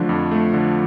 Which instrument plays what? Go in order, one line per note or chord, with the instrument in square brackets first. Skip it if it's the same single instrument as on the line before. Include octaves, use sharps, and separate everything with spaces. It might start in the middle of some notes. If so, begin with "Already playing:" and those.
Already playing: [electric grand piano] D3 A3 D4 [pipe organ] F3
[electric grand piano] F2
A3
D3